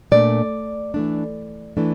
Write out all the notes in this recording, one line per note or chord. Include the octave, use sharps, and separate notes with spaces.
A#2 A3 D4 D5
E3 A3 D4
E3 A3 D4